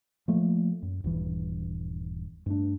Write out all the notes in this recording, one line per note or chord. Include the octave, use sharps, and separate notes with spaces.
F3 A3 A#3
F#2
D#1 G2 E3
G2 A3 D4